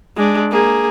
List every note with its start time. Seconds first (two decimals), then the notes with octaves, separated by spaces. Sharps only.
0.16 G#3 D4
0.51 A#3 G#4